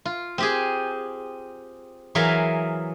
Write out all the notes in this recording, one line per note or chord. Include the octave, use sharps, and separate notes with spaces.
F4
C4 G4 G#4
E3 F#3 G#4 A#4 E5 F5